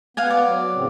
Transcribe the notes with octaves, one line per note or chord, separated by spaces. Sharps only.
B3 F5 F#5 G#5
D5
F#3
A2 C#3 C4